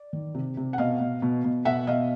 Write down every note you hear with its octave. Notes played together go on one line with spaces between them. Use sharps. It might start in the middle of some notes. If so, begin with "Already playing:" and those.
Already playing: D5
D#3
C3
C3
F#5
B2 D#5 F5
B2
B2
B2
B2 E5 F#5
B2 D#5 F5